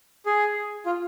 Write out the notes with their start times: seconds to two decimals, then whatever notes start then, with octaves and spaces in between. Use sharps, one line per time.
0.26 G#4
0.86 F4